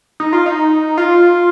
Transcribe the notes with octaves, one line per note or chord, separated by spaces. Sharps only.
D#4
F4
D#4
F4